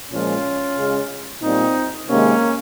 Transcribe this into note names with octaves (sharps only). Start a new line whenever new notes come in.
A#2 F3 G#3 C#4 F4
C#3 G#3
A#2 G3 C4 D#4
C3 D#3 G#3 A#3 C#4